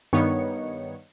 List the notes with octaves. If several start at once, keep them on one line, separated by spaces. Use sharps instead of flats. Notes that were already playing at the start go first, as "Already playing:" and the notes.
G2 D#3 B3 D#4 C#5 C#7